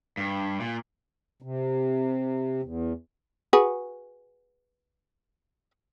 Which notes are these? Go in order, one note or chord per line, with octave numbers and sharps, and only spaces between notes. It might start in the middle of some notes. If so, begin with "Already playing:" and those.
G2
A#2
C3
E2
F#4 G#4 B4